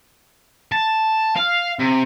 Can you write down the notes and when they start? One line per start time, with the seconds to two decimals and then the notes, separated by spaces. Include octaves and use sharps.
0.72 A5
1.36 F5
1.79 C3